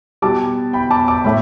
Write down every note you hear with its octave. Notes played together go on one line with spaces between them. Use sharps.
B2 G3 A5 D6
G5 B5
A5 D6
A5 D6
A2 A3 G5 B5